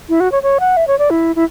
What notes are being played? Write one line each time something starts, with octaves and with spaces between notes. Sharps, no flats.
E4
F#4
C#5
C#5
F#5
E5
C#5
D5
E4
E4